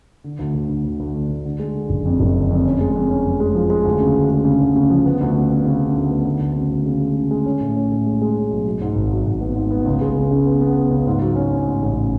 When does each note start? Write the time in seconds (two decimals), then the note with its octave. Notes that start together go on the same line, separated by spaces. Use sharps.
0.24 D3
0.39 D2
0.54 D2
0.69 D2
0.85 D2
1.00 D2
1.15 D3
1.30 D2
1.45 D3
1.59 G#3
1.75 D3
1.89 F#1
2.05 F2
2.20 F#1
2.35 D3
2.51 F2
2.65 C#4
2.81 G#3
2.96 F2
3.11 C#4
3.25 F2
3.40 G#3
3.55 F3
3.70 G#3
3.85 D2
4.00 C#3
4.16 D2
4.30 G#3
4.45 C#3
4.60 D2
4.76 C#3
4.90 F3
5.05 B3
5.21 D2
5.36 C#3
5.50 B3
5.65 C#3
5.81 C#3
5.96 D2
6.11 B3
6.25 D2
6.40 D2
6.56 C#3
6.70 D2
6.86 C#3
7.00 G#3
7.16 C#3
7.31 G#3
7.46 C#4
7.61 A2
7.76 C#4
7.91 A2
8.06 G#3
8.22 G#3
8.36 C#4
8.51 B1
8.66 F#3
8.81 G#2
8.96 G#1
9.11 F#3
9.27 G#1
9.41 B3
9.56 G#2
9.71 B3
9.86 C#2
10.01 G#3
10.16 C#3
10.31 C#3
10.46 B3
10.61 B3
10.77 B3
10.91 C#2
11.07 G#2
11.21 F#3
11.36 C#4
11.51 C#4
11.66 G#2
11.82 A1